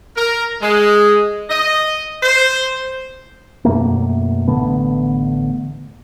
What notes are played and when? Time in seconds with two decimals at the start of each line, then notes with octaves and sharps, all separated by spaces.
0.16 A#4
0.62 G#3
1.50 D#5
2.23 C5
3.65 F#2 B2 A3 A#3
4.48 A1 D3 A3 B3